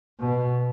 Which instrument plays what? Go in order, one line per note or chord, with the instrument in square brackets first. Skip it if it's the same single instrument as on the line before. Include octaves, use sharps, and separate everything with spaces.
[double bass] B2